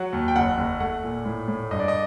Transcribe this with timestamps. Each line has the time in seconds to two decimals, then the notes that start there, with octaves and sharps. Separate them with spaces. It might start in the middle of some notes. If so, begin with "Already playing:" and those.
Already playing: F#3 F#5
0.13 D#2
0.28 G5
0.36 F#1 F#5
0.58 F#1
0.80 A3 F#5
1.03 A#2
1.25 A2
1.48 A2
1.71 G2 D#5
1.79 D5
1.88 D#5